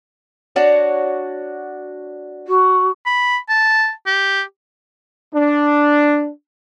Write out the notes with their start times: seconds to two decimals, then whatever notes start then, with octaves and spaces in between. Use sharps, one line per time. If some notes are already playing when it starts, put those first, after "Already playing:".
0.56 D4 F#4 C#5
2.48 F#4
3.06 B5
3.49 A5
4.06 G4
5.34 D4